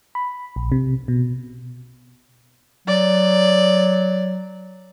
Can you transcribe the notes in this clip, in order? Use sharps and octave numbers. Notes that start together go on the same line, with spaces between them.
B5
A#1
C3
B2
F#3 D5